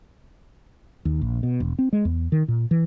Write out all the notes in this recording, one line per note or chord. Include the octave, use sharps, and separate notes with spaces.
D#2
A#1
B2
E1
C4
G#3
E2
D#3
A#2
E3